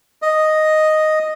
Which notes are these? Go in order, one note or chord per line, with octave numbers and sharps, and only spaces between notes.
D#5